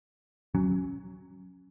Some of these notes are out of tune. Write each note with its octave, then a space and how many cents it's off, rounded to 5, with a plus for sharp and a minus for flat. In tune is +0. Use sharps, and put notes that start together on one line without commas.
F#3 +0 C#4 +0